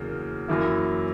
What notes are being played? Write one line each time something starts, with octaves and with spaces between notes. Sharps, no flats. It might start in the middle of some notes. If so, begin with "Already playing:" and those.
Already playing: E2 C#3 F#3 A#3
F#2 E3 A#3 E4